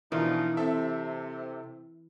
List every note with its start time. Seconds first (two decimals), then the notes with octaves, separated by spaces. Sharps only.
0.12 B2 E3 F3 D4 D#4 F4 A#4
0.57 C3 C4 A4 E5